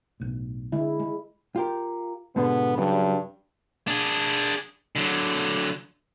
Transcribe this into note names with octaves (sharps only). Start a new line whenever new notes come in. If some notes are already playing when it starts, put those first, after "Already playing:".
B1 A2
D3 G#3 E4
G#3
F4 G4 A#4
G#2 B2 D3 B3
G2 C#3 F#3
D4 G#4
D3 F#3